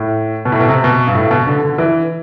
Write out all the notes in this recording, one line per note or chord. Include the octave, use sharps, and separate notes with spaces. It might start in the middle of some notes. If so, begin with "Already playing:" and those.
Already playing: A2
B2
A2
B2
C3
B2
G2
A2
B2
D3
D3
E3